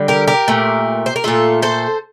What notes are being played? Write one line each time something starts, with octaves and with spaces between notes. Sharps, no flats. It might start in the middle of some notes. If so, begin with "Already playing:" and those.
Already playing: D3 G3
G4 A#4
G4 A#4
A#2 A3
C5
A#4
A#2 A3 F4 A4
A4 C5